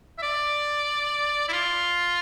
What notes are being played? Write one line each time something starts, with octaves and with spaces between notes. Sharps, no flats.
E5
D5
E4
F4